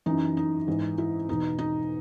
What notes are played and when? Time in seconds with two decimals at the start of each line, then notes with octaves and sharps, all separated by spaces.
0.06 F#2 E3 D#4
0.37 D#4
0.67 G#2 E3
0.98 E4
1.29 E2 B2 D#4
1.59 D#4